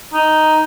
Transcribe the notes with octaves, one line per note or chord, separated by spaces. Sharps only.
D#4